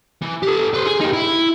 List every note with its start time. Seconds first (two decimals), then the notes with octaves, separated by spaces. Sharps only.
0.22 E3
0.43 G4 A4
0.74 B4 C5
0.87 G#4
1.01 D#4 G4
1.13 E4